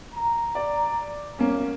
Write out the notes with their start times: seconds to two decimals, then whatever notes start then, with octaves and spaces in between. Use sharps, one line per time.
0.14 A#5
0.55 D5
1.39 G#1 F#2 A#3 C#4